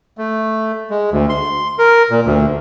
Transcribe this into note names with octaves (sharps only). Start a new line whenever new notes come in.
A3
G#3
D2
C6
A#4
A#2
D2